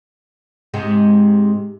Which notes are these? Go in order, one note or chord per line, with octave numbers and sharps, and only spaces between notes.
G#2 C3 G#3